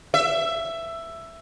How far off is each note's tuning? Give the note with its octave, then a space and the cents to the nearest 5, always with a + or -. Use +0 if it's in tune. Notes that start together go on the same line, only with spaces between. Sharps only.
E5 +10